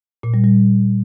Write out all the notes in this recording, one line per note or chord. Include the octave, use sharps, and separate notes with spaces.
A#2
G3
G3